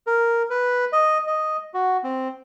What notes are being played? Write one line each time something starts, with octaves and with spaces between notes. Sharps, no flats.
A#4
B4
D#5
D#5
F#4
C4